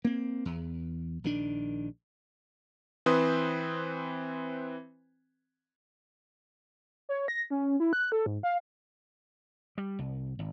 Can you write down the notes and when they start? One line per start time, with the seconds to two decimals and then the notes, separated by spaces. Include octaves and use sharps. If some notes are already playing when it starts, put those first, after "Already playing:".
0.05 A#3 C4
0.45 E2
1.24 A#1 D#3 D4
3.06 E3 C4 B4 C5 C6 D#6
7.09 C#5
7.28 A#6
7.50 C#4
7.80 E4
7.93 F#6
8.12 A4
8.26 G#2
8.43 F5
9.78 G3
9.99 C2
10.39 G#1